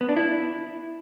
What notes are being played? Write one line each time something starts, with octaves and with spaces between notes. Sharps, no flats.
B3
D4
E4